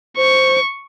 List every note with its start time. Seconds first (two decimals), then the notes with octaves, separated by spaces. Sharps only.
0.17 C5 C#6